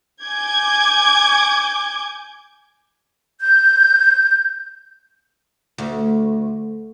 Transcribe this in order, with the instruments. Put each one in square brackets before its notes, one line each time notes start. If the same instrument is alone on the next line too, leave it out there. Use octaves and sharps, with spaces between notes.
[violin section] G#5 D6 G6 G#6
[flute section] G6
[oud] D2